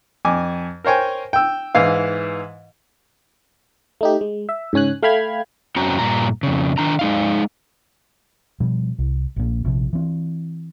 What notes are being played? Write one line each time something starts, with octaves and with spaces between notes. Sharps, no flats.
F2 G#5 D6
A#4 C5 C#5 G5 G#5
G5 E6
G#2 E3 F5
A3 D#4 G4
G#3
E5
G#2 C#3 C#4 G#5 F#6
A3 F5 G5 B5 F6 G#6
F#2 C4 C#4 F#4 G5 A#5
G2 A#2 A#5
F2 C#3
D#3 D4 A#5
G#3 D#4 F5
B2 F3 G3
C2
A#1 A#2
A#1 C3 F3
E3 C4